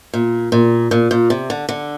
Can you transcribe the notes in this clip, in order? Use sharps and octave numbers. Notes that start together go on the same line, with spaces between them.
A#2
A#2
A#2
A#2
C3
D3
D3